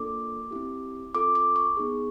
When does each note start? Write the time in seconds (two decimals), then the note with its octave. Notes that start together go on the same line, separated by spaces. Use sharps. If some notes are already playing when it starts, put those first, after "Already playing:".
Already playing: A#3 D4 F4 A4 D6
0.51 C4 E4 G4
1.14 C4 F4 A4 D6
1.35 D6
1.56 C#6
1.77 B3 D#4 G#4